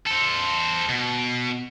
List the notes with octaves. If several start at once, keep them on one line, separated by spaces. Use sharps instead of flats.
A4 C5
B2